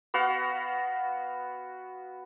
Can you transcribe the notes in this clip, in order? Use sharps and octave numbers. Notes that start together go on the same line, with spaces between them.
B3 F#4 F5